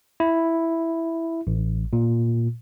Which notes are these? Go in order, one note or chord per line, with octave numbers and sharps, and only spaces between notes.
E4
A1
A#2